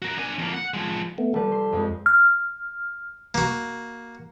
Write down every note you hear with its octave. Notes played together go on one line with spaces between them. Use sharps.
F#4 A#4
D4 G#5
F2 A#3
F#5
F3 G#3
A3 B3
F3 G3 A4 B4
C6
F2 G#3 C4
F6
A#3 F#4